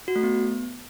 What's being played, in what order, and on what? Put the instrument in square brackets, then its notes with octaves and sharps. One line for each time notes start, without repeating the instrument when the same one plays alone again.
[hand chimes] F#4
A3
B3